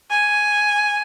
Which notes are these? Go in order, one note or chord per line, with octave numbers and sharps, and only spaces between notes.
G#5